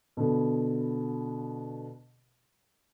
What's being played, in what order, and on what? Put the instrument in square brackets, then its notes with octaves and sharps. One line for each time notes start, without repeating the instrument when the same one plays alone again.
[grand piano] B2 D3